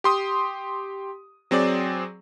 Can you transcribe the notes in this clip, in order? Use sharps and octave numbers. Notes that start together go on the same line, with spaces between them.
G4 C6 D#6
F#3 C4 G#4 D5